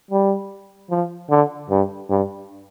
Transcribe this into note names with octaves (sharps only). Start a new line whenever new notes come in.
G3
F3
D3
G2
G2